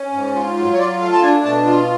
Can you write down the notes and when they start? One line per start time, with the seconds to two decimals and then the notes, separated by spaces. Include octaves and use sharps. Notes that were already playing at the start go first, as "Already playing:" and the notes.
Already playing: C#4
0.13 G#2
0.35 F4
0.57 F#3
0.73 C#5
0.79 F4 D5
1.00 A3 F5
1.12 A5
1.22 D4 G#5
1.44 B2 A5
1.66 F4